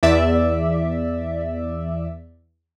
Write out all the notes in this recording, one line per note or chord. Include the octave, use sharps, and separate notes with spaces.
E2 D5 E5